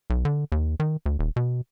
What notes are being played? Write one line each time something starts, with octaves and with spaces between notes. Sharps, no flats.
B1
D3
D#2
D#3
D2
D#1
B2